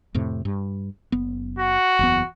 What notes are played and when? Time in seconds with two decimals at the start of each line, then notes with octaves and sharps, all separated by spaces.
0.14 F2 A2 C3
0.45 G2
1.12 F#1 B3
1.59 F#4
1.99 F#1 E2 B3